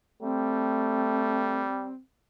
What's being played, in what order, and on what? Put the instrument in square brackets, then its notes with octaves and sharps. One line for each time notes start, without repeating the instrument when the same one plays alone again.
[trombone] G3 [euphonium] A3 [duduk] C4